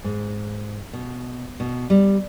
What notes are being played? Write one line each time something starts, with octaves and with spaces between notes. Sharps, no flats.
G#2
B2
B2
G3